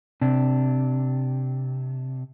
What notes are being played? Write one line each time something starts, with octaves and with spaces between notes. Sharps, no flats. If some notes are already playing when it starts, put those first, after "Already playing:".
C3 D4